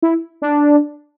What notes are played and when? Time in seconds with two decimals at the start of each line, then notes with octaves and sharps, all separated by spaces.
0.02 E4
0.42 D4